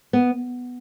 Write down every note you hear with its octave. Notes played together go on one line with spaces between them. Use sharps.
B3